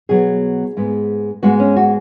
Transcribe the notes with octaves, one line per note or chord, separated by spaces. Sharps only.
B2 F#3 B3 G#4
G#2 G#3 B3
G#2 G#3 B3 F#4
C#4
F#4